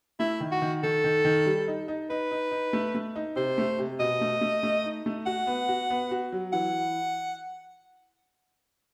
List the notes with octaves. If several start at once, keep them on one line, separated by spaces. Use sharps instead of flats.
A3 E4
D#3
F#4
D#3
D#3 A4
D#3
D#3
G3
D#4
D#4
D#4 B4
D#4
D#4
A3
A3
D#4
C3 C5
A3
C3
B2 D#5
A3
A3
A3
D#4
A3
F#4 F#5
B3
F#4
B3
F#4
F#3
E3 F#5